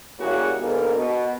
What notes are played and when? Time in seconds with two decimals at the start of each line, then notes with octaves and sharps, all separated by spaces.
0.19 C#3 G3 A#3 E4 F#4 G#4
0.59 G#2 D3 A#3 B3 A#4
0.95 B2